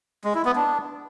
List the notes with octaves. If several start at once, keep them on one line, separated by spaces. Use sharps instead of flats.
G#3
E4
B3
D4